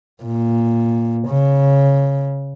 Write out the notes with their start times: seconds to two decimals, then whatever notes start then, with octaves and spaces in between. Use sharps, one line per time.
0.23 A#2
1.27 C#3